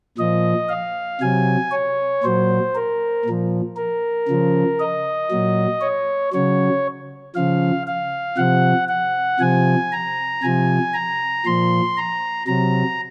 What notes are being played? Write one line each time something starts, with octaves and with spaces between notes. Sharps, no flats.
A#2 F3 D#5
F5
C3 F#3 G#5
C#5
A#2 F#3 C5
A#4
A#2 F3
A#4
C#3 F3
D#5
A#2 F#3
C#5
C#3 F#3 C#5
C#3 F3 F5
F5
C3 F3 F#5
F#5
C3 F3 G#5
A#5
C3 F3 G#5
A#5
A#2 F3 C6
A#5
C3 F#3 A#5